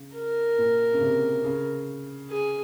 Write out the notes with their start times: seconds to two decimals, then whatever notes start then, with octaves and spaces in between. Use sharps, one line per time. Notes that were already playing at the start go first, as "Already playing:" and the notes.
Already playing: C#3
0.16 A#4
0.58 A#2
0.94 C#3
1.00 C3
1.44 C#3
2.30 G#4